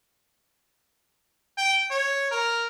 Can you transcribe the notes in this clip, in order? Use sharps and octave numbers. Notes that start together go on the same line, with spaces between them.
G5
C#5
A#4